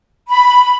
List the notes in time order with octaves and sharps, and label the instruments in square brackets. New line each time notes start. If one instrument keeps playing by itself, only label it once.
[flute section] B5